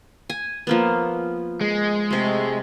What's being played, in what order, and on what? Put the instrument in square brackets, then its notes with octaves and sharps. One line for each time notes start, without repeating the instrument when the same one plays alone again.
[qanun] G#5
F3 A#3 B3
[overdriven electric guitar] G#3
[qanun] C3 A3